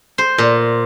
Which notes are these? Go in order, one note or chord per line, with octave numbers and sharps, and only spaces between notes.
C5
A#2